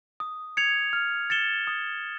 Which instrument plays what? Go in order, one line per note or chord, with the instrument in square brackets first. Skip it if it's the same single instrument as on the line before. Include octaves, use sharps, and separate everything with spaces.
[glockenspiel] D#6
G#6 C#7 F7
F6
A6 C#7 E7 G7
D#6